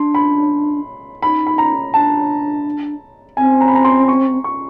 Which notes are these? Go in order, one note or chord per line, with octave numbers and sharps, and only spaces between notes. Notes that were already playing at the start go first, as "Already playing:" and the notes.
Already playing: D4 C6
B5
D#4 B5
B5
A#5
D4 A5
C4 G#5
A#5
B5
A#5
C6
C#6
C#6